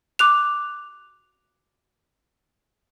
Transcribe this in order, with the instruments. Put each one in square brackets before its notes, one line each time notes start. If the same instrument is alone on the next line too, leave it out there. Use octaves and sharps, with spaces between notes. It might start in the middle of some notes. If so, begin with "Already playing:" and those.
[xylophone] D6 F#6 F7